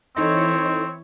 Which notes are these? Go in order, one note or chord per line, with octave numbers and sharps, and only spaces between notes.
E3 C4 D#4 E4 A4 C#5 D#5